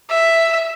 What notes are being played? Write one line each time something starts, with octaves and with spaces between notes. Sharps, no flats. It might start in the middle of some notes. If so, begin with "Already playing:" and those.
E5